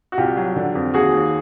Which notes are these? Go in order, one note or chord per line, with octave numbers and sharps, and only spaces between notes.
F#4
C2 F4 G4
F#3
D3
F2
D#2 F#4 G#4
D#2